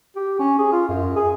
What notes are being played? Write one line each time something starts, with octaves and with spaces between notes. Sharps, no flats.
G4
C#4
G#4
F4
F#2
G#4